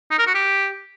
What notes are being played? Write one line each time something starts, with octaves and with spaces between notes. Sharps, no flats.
D#4
A#4
F#4
G4